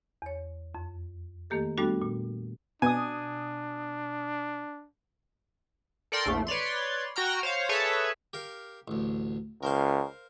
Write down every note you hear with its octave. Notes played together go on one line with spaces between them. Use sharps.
E2 C#5
F2
D#3 A3 A#3 G4 A4
G3 A3 B3 D4 F#4 A4
A#2
B2 D4 G#5 D#6
A4 A#4 D5 G5 C6
A#1 E2 A3
B4 C#5 D5 C6
F#4 G5 A#5 F6
C5 C#5 F5
G#4 A4 B4 C#5 E5 A5
G4 A#4 F5
A1 D2
C#2 A#4 C5 F5